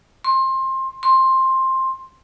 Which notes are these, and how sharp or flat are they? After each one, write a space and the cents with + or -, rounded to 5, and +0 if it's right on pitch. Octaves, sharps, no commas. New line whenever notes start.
C6 +25
C6 +15